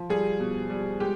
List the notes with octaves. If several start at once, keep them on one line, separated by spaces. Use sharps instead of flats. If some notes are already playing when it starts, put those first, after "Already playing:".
Already playing: F3
G3 G#4
B2
G3
G#3 G4